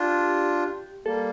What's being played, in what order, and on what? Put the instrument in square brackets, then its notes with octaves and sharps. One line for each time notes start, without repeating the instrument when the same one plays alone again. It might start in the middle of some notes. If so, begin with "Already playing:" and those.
Already playing: [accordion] D4 F4 [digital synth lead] G4
[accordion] G3 A#3 [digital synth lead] A4